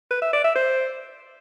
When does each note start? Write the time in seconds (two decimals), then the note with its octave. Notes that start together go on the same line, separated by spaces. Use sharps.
0.11 B4
0.22 E5
0.33 D5
0.44 E5
0.55 C5